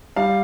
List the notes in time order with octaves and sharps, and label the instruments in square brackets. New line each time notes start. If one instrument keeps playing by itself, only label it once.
[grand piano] G3 F5